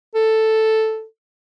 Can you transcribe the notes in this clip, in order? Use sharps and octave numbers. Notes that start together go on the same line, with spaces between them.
A4